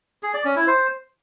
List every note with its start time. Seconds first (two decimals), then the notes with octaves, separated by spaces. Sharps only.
0.23 G#4
0.34 D5
0.45 C#4
0.56 E4
0.67 C5